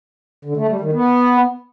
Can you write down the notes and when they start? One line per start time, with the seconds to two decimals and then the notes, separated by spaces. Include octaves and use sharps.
0.45 D3
0.57 A3
0.69 G3
0.81 D#3
0.92 B3